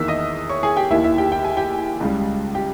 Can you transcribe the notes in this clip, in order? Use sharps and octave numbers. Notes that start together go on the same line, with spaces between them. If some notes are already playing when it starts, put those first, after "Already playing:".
Already playing: E2 D#3 A#3 E5 E6
D#5 D#6
C#5 C#6
G#4 G#5
G4 G5
D#2 D#3 A#3 E4 E5
E4 E5
G4 G5
G5
G#5
G4 G5
C#2 C#3 G3
G4 G5